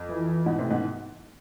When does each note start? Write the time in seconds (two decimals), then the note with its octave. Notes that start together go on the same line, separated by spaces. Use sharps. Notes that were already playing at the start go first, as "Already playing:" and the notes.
Already playing: F2
0.09 E3
0.46 G#2 B2
0.59 A2 C3
0.70 G#2 B2